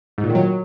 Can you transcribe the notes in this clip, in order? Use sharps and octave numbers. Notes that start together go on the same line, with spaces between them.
G#2
A#2
D#3
F#3